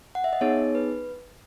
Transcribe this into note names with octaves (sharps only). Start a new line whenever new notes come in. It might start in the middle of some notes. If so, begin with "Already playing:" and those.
F#5
E5
D#5
B3 D#4 G#4 C#5
B4